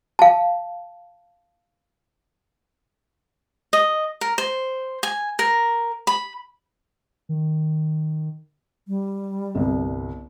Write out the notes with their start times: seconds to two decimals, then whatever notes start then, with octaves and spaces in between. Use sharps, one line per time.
0.19 F5 A5
3.73 D#5
4.21 A#4
4.38 C5
5.03 G#5
5.39 A#4
6.07 B5
7.29 D#3
8.88 G3
9.55 G1 C2